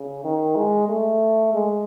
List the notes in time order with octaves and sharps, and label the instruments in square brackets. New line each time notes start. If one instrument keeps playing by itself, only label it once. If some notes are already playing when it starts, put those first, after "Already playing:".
Already playing: [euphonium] C#3
D#3
G#3
A3
G#3